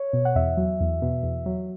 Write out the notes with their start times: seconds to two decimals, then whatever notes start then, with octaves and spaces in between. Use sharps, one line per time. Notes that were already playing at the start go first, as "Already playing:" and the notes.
Already playing: C#5
0.13 B2
0.25 F#5
0.35 E2 E5
0.57 F#3
0.80 E2
1.02 B2
1.23 E2
1.46 F#3